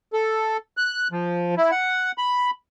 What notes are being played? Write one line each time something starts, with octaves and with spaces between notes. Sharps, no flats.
A4
F#6
F3
E4
F#5
B5